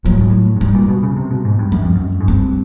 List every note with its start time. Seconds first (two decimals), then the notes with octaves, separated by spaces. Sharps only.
0.05 A#2 F#3
0.13 A2
0.21 G#2
0.30 A2
0.56 G2
0.60 G#2 G3
0.75 A#2
0.88 B2
1.03 C#3
1.17 C3
1.31 B2
1.45 G#2
1.59 G2
1.72 F#2 G#3
1.83 F2
1.95 F#2
2.20 G#2
2.28 G2 C4